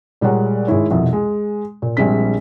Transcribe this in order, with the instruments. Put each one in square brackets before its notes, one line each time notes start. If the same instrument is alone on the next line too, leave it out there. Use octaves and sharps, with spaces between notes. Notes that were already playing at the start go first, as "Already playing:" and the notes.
[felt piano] A#2 G3 G#3 C#5 F#5 A#5
G#1 G#3 E4 C#5
C2 F2 B2
G#3
A#2
A#1 G3 G#3 C4 B6